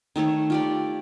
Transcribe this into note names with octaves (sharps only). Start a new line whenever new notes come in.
D#3 A3 A4 C#5
F4 G4 D5